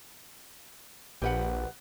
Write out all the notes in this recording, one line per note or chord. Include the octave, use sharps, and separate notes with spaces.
A#1 G4 B4 F#5